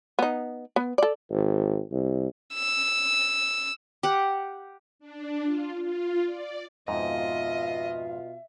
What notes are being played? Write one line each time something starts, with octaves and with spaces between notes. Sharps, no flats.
B3 D#4
B3
A4 D5
G#1
C2
E6
G4 F#5
D4
F4
F4
D5
F2 G#2 B2 F4 D#5 E5